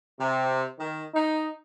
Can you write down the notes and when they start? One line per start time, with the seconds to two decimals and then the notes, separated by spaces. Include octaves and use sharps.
0.19 C3
0.79 D#3
1.15 D#4